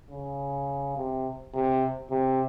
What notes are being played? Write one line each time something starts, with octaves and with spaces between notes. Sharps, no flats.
C#3
C3
C3
C3